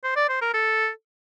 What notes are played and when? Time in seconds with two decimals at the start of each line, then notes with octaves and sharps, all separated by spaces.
0.04 C5
0.16 D5
0.29 C5
0.41 A#4
0.54 A4